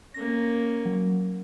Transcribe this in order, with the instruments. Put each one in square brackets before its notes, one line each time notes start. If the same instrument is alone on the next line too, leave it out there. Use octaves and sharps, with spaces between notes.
[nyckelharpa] A#3 C#4 [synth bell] A#6
[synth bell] F#3